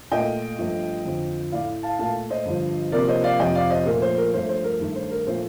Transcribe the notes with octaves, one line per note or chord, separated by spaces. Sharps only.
A#2 A3 D#5 G5
G2 F3 A3
F2 D3 F3
A2 A3 D5 F5
F5 A5
A#2 A3 F5 A5
C5 D#5
G2 D3 F3
C3 F3 A#3 A#4 D5
C5 D#5
D5 F5
F2 C3 F3 D#5 G5
D5 F5
C5 D#5
A#2 F3 A3 A#4
C5
A#4
G2 F3 A3 C5
C5
A#4
G2 D#3 A3
C5
A#4
A#2 F3 A3 C5